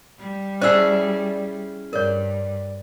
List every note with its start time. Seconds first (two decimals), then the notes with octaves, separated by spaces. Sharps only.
0.19 G3
0.61 C#4 E4 G#4 C5 D5 E5 A5 E6
1.93 G2 A#4 C#5 D5